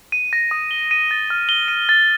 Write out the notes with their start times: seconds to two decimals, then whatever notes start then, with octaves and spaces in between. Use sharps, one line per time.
0.12 D#7
0.33 A#6
0.51 D#6
0.71 G7
0.91 D#7
1.11 A6
1.30 F6
1.49 G7
1.68 D#7
1.89 A6